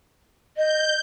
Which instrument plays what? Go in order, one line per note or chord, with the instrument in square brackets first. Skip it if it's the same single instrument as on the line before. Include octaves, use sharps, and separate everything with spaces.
[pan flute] D#5 [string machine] G6